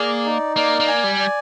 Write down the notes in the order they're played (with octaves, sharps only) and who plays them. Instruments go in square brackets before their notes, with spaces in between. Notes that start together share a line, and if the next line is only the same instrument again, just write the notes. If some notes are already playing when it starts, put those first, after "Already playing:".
Already playing: [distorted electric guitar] A#3 [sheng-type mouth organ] G#4 D5
[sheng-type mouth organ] D#4
[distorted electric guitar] A#3 [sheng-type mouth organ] D5
[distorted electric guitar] A#3
[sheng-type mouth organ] G#5
[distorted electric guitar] G3
[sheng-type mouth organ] D5